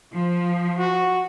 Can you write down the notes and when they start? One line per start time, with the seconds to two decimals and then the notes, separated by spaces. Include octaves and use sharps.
0.14 F3
0.78 F#4